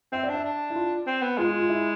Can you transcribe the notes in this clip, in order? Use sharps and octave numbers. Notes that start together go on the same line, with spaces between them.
C4 E5
D5
D4
E5
D4
E4
F4
C4
B3
G#3 F4
F4
F4
E4